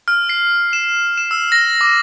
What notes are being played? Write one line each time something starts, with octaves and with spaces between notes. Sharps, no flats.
F6
C7
E7
E7
E6
A#6
D6